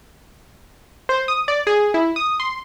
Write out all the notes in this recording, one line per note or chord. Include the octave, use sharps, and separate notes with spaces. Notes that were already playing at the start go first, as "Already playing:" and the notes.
C5
D#6
D5
G#4
E4
D#6
C6